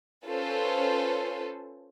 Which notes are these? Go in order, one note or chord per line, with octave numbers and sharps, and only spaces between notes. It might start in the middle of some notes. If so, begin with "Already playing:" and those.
C#4 F4 A4 B4 C5